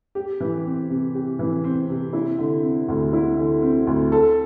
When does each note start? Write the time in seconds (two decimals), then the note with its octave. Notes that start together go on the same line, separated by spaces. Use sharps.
0.15 G4
0.40 E3
0.65 C4
0.90 C3
1.15 G4
1.39 E3
1.64 C4
1.89 C3
2.13 E4
2.38 D3
2.63 C4
2.88 D2
3.13 E4
3.37 D3
3.63 C4
3.87 D2
4.12 A4